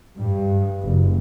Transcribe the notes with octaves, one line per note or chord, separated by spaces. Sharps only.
G2
F#1